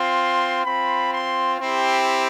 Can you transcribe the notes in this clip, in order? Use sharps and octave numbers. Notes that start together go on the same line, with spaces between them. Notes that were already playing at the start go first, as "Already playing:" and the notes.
Already playing: C4 F4 C6
C4 F4 B5
C6
C4 E4 G4 C6